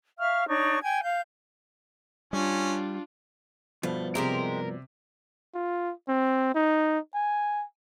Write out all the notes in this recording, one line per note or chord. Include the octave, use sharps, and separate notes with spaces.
E5 F5 C#6 F6
D4 D#4 C#5 C#6
G5 G#5 G#6
F5 G6
G3 C#4 D4 F4
G2 B2 F3 A3
C3 G#3 G4 A#4 C5
F4
C4
D#4
G#5